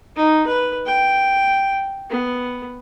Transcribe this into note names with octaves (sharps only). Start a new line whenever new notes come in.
D#4
B4
G5
B3